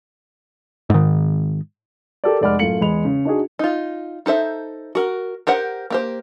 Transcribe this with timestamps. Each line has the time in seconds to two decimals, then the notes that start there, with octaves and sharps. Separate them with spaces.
0.90 G#2 D#3
2.24 G4 A4 A#4 D5
2.41 F1 G#3 D5 F#5 B5 F6
2.59 F#2 A2 A3 F4 C#7 F#7
2.81 E2 G#3 B5 F7
3.05 C#3
3.25 D4 D#4 F#4 G#4
3.59 D#4 F4
4.26 D#4 A4 C5 E5
4.95 F#4 A#4
5.47 G4 A#4 C5 F#5
5.90 A#3 G4 C5